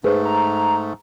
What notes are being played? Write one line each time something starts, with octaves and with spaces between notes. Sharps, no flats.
G#2 A3 G#4 B4 C5
A#5